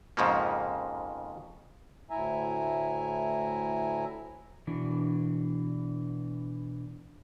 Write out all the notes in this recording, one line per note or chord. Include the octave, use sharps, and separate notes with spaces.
F2 G#2 C#3 F3 A#3
D2 A2 E4 E5 G#5 A#5
B2 E3 D4 F#4